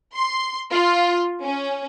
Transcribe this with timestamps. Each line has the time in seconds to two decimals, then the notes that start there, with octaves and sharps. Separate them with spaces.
0.14 C6
0.73 F4
1.42 C#4